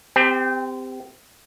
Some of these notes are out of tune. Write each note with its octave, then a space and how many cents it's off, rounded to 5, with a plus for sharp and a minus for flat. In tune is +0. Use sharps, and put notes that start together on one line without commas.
C4 -25 G4 +20